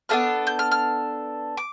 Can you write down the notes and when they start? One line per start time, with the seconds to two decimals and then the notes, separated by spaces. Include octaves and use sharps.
0.09 B3 D4 F4 A4 F6
0.47 G6
0.59 F6
0.71 F6
1.57 D6